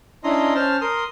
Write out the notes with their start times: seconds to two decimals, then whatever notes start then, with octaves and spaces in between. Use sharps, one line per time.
0.24 C#4 D4 E4 D#5 A#5 C6
0.55 C#4 C5 A5 F6
0.81 A#4 C6 D#6